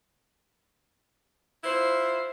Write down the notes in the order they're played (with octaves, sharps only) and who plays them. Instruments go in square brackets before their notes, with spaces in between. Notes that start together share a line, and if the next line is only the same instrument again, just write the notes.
[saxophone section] E4 F4 C5